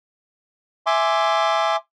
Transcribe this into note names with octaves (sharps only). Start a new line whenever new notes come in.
E5 G#5 C6 D6